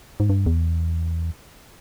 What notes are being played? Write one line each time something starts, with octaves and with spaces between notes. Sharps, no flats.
G#2
G2
E2